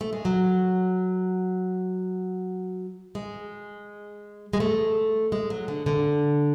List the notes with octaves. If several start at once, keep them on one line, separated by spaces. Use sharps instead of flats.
A3
G#3
F#3
G#3
G#3
A3
G#3
F#3
D3
D3